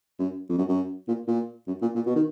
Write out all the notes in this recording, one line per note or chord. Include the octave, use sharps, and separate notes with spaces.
F#2
F2
F#2
F#2
A#2
A#2
F#2
A#2
A#2
B2
D#3